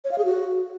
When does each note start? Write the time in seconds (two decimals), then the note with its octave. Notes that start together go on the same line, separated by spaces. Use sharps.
0.05 C#5
0.11 F5
0.18 G#4
0.25 F#4